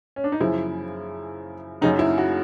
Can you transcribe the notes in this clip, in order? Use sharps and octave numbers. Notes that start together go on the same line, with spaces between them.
C#4
D4
D#4
F#2 C#3 F3 E4
F#2 C#3 F#3 D#4
E4
F#4